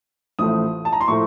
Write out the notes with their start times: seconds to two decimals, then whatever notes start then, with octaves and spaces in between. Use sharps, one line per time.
0.39 A1 A2 F3 A3 D#6
0.85 A5
0.93 A#5
1.01 C6
1.08 A2 F3 A3 C#6